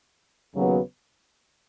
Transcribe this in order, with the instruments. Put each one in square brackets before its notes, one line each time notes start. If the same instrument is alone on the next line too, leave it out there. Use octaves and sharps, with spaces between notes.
[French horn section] D#2 C#3 F#3 B3